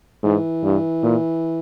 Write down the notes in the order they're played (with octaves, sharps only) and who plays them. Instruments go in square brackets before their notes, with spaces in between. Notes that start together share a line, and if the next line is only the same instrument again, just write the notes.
[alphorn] G#2 [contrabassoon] E3
[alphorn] G2
A#2